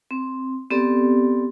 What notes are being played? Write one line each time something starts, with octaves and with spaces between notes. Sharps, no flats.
C4
B3 C4 G4 A4 D5